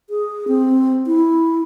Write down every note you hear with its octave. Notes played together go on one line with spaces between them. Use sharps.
G#4
C4
E4